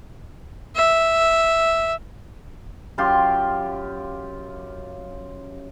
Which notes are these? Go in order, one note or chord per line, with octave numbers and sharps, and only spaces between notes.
E5
F#2 F4 G4 C6